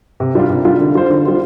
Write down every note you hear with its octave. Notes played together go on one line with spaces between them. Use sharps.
C3
G3 D4 F4
C3
G3 D4 F4
D3
G3 F4 C5
D3
G3 F4 C5